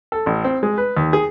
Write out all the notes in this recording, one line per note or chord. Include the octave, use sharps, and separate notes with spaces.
A4
A1
C4
G#3
B4
D#2
G#4